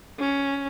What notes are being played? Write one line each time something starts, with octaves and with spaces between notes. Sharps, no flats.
C#4